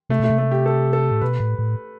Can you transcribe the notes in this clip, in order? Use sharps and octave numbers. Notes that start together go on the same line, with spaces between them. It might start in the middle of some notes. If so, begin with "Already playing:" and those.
C3 A3
B2 A3
C3
A3
G4
A4
A4
A2
B2 B4
A2
A2